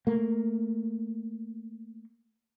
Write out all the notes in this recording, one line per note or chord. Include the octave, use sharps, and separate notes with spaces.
A3 A#3